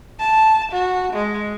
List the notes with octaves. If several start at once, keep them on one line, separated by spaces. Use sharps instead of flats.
A5
F#4
G#3